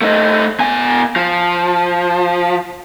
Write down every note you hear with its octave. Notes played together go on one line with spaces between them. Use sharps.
A3 D#4
B2 G#5
F3